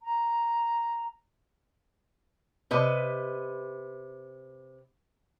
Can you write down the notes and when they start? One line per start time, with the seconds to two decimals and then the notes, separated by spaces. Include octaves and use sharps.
0.02 A#5
2.71 C3 B4 D#5